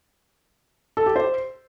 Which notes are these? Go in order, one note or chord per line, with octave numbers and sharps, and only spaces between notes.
A4
G4
C5